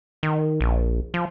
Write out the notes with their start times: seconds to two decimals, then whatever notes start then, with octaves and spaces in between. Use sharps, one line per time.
0.23 D#3
0.61 A#1
1.14 F3